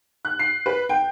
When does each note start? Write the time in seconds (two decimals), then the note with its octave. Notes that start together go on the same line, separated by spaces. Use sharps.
0.25 F#6
0.39 C7
0.66 B4
0.89 G5